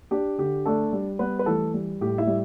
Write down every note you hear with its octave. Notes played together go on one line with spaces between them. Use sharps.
D4 G4
D3 G4
A3 D4 A4
G3
G3 B3 B4
B4
E3 A3 A4
G3
A2 G4
E4 E5
G3